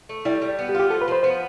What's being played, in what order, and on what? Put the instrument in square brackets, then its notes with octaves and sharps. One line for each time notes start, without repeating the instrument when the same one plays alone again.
[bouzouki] A3
[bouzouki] G3 [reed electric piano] E4
[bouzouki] G3
B3
[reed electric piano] G4
[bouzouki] F4
[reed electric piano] G4
[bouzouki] F3 [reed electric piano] A4
[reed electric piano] B4
[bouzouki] F3 [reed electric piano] C5
[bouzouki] B3 [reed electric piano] C5